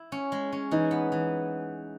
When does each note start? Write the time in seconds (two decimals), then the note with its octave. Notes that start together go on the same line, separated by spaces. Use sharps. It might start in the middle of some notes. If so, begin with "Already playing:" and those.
Already playing: E4
0.12 C#4
0.32 G#3
0.53 C#4
0.72 E3 D#4
0.91 B3
1.12 E3